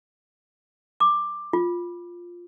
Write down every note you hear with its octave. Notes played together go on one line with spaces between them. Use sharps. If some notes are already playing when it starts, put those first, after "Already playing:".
D6
F4